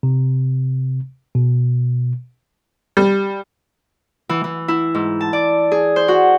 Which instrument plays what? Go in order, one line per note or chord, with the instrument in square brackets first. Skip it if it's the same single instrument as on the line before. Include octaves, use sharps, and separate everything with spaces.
[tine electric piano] C3
B2
[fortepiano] G3
[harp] E3
E3
E4
G#2
A5
D5
G#4
C5
F#4